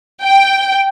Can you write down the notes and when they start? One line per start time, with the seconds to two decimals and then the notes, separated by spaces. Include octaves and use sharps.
0.23 G5